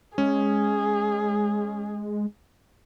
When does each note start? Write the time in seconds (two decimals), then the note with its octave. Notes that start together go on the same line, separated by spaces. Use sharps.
0.18 G#3 C#4 G#4